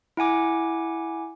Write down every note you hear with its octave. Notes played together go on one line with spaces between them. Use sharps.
E4 F#5 G#5 D6